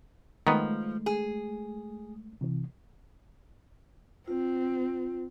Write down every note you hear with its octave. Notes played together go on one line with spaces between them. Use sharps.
D#3 F3 G#3 A3 B3
G#4
C3 E3
C4 F4